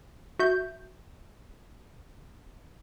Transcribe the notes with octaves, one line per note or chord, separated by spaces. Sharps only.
F#4 E5 G6